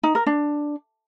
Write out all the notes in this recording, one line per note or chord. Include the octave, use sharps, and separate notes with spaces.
D#4
A#4
D4